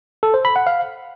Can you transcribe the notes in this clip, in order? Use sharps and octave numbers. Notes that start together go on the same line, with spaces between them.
A4
C5
B5
F#5
F5